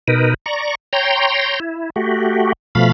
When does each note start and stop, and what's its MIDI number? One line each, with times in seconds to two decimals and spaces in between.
0.08 0.34 47
0.08 0.34 63
0.08 0.34 70
0.08 0.34 71
0.46 0.75 74
0.46 0.75 82
0.46 0.75 85
0.93 1.60 73
0.93 1.60 79
0.93 1.60 82
0.93 1.60 84
1.60 1.90 64
1.96 2.53 57
1.96 2.53 66
1.96 2.53 67
2.75 2.92 47
2.75 2.92 53
2.75 2.92 57
2.75 2.92 77
2.75 2.92 83